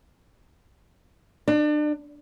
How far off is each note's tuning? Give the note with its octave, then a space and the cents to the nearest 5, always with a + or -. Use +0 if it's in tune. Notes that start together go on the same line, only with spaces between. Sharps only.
D4 +35